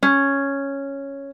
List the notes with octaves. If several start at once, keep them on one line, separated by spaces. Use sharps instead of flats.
C#4